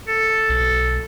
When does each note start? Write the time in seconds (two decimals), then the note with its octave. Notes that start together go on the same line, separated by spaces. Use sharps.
0.08 A4
0.49 B1